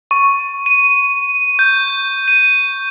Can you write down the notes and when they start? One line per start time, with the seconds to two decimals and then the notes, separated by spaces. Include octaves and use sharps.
0.11 C#6
0.66 D#7
1.59 G6
2.28 D#7